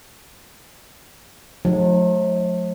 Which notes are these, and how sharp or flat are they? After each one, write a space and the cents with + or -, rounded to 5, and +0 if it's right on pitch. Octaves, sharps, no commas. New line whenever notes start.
F3 +45 A3 -35 D#4 +0